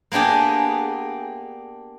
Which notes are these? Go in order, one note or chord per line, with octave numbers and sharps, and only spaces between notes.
A#3 B3 D4 G4 G#4